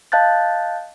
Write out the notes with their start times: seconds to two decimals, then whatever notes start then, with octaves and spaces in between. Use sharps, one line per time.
0.12 D#5 F5 A5 F#6 G6 A6